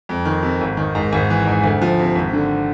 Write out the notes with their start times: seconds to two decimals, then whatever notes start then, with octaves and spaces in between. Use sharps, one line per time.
0.09 F2
0.25 D#3
0.43 C3
0.61 G#1
0.77 D#3
0.95 G#2
1.13 G#1
1.30 E3
1.47 G#2
1.64 D2
1.82 F3
1.99 C3
2.16 G#1
2.33 D3